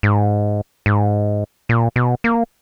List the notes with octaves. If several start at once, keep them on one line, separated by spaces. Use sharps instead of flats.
G#2
G#2
A#2
B2
A#3